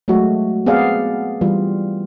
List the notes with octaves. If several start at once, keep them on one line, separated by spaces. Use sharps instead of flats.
F#3 G#3 A3 F#4
B3 C4 G#4 D5 F5 F#5
E3 G3 F4